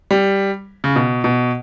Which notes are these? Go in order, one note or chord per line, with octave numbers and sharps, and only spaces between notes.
G3
C#3
B2
B2